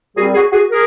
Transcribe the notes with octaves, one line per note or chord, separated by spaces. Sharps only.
A#2 G3 C4 F#4 G#4
F#4 G#4
F#4 G#4
G#4 A#4